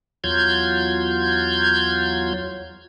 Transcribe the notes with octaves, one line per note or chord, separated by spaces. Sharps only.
E2 F#3 F4 G6 G#6